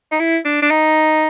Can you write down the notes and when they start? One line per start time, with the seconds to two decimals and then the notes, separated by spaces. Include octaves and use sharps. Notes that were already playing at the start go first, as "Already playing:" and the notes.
0.11 D#4
0.20 E4
0.45 D4
0.62 D4
0.70 D#4